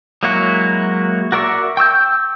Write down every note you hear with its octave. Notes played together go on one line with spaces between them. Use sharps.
F#3 G#3 A#3 E4 F#4
F#4 A#4 D5 E5 C#6
G5 C#6 E6 G6